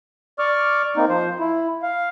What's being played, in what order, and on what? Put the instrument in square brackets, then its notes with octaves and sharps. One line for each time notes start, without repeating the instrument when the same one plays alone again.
[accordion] D5 C#6 D6 F6
A#3 C4 D#4
F3 C5
E4
F5